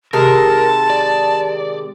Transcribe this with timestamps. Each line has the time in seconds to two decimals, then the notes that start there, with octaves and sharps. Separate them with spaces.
0.13 C3 D#3 G#3 A#4 A5
0.90 D5